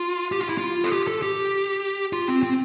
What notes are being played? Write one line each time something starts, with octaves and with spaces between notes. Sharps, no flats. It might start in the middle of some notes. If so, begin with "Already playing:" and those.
Already playing: F4
G4
F4
E4
F4
A4
G4
A4
G4
F4
C4
C4